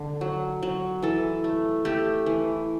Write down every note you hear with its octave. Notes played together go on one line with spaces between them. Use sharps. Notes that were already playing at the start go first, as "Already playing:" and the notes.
Already playing: D3
F#3
F#3
E3 A4
A3
A3 G4
E3